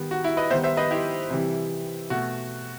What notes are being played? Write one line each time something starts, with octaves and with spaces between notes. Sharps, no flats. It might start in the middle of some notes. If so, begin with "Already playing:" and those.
Already playing: D#3 G3 B3
F#4
E4
B4 D#5
D#3 G3 B3 C5 E5
C5 E5
B4 D#5
E4 G4
C3 E3 G3
B2 A3 F#4